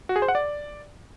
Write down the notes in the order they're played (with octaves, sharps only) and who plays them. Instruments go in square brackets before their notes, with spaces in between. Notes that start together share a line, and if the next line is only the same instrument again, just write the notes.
[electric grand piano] F#4
G#4
C5
F#5
D5